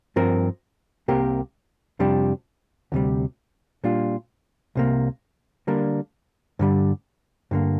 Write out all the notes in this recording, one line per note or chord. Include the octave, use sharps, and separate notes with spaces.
G2 F3 C4 A#4
C2 C3 A#3 G4 A#4
F2 C3 G3 D4 G4
D2 C3 G3
A#2 G3 D4 F4
C2 C3 A#3
D3 G3 A#3 D4 A#4
G2 D3 G3
G2 D3 A#3